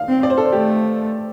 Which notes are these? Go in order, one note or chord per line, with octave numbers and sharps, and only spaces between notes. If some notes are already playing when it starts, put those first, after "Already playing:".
Already playing: F5
C4
D5
C5
A4
C5
A3 G4